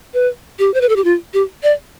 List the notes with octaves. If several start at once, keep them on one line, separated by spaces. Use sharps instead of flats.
B4
G4
C5
B4
A4
G4
F4
G4
D5